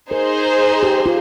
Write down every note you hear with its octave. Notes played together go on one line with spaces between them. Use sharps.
D#4 G#4 A#4 C5
G4
F4